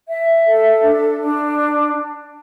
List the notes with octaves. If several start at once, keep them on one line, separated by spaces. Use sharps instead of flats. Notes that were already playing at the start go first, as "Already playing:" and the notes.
E5
A4
D4
D4